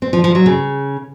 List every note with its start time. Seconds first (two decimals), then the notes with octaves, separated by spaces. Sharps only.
0.02 C4
0.13 F3
0.24 F3
0.35 F#3
0.46 C#3